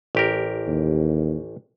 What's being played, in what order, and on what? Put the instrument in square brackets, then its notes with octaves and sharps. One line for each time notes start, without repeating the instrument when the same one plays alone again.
[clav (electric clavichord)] A1 G4 A#4
[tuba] D#2